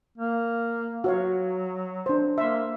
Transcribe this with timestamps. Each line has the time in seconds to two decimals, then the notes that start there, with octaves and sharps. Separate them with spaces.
0.18 A#3
1.04 F#3 F#4 C#5 F5
2.06 D4 C5
2.38 A#3 E5 C6